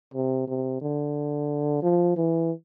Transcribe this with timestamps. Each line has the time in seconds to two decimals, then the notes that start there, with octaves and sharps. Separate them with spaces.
0.14 C3
0.47 C3
0.81 D3
1.83 F3
2.16 E3